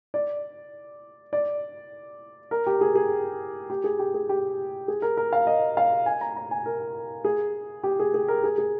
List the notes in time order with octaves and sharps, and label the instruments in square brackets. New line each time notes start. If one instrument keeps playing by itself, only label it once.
[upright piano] D5
D5
A#4
G4
G#4
G#4
G4
G#4
G4
G#4
G4
G#4
A#4
A#4
F5
D#5
F5
G#5
A#5
A#5
G#5
A#4
G#4
G4
G#4
G#4
A#4
G#4
G#4